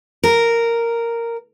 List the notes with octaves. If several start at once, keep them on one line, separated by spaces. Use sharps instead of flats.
A#4